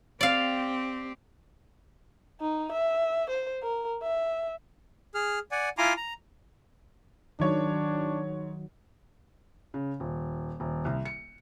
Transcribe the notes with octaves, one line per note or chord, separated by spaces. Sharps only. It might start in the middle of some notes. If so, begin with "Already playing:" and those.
C4 G4 D5 F5
D#4
E5
C5
A#4
E5
G#4 F6
D5 F#5 G#5
E4 F4 G#5 A#5 C6 D6
A#5
G#2 D#3 F#3 D4 C#5
C#3
D#1
D#1
C2
C#7